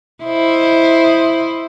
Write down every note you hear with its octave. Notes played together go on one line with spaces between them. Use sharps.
E4 C5 D#5